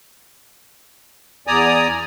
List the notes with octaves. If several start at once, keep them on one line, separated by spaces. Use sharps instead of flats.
E2 D5 G#5 A#5 D#6